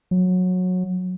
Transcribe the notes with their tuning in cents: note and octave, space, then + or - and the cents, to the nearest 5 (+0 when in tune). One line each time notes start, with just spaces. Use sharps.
F#3 -20